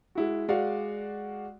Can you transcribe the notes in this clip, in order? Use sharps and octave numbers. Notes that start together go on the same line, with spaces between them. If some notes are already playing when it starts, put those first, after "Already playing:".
G#3 E4 F#4
G#3 F#4 D5 F5